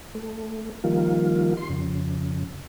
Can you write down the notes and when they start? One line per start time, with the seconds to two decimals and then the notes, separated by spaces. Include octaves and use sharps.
0.15 A3
0.84 D#3 F3 G3 A#3 F4
1.57 C6
1.69 F2 C#3